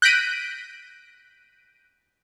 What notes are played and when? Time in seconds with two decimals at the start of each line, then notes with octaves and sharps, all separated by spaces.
0.02 F#6 G6 A#6 B6 D7 D#7